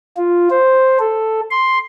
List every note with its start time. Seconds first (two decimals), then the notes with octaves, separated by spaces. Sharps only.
0.17 F4
0.50 C5
0.99 A4
1.50 C6